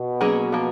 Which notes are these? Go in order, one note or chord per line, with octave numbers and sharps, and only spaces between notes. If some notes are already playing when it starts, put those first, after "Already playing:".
Already playing: B2
F#3 A#3 C#4 G#4
F3 A#3